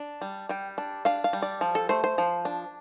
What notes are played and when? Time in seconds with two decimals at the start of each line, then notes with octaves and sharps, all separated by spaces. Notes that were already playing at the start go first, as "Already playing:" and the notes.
Already playing: D4
0.22 G3
0.49 G3 G5
0.78 D4
1.05 D4 F5
1.24 F5
1.33 G3
1.42 D5
1.61 F3
1.75 A4
1.89 A3 C5
2.04 C5
2.18 F3
2.45 D4